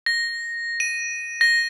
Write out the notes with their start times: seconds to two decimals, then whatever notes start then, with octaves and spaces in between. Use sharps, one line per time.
0.06 A#6
0.80 D#7
1.41 A#6